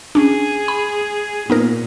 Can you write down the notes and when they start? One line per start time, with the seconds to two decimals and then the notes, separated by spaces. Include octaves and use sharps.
0.15 C#4 D4 G#4
0.68 B5
1.50 A#2 B3 D#4 A#4